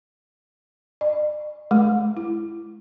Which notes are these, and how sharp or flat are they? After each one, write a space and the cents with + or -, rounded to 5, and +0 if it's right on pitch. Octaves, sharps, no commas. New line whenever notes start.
D5 +45
G#3 +30
E4 +20